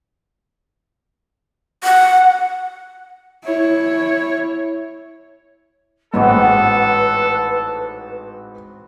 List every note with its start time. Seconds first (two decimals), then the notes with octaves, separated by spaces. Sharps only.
1.84 F#5
3.44 E4 C#5
6.14 A1 G#2 B3 C4 F#4 A4 B4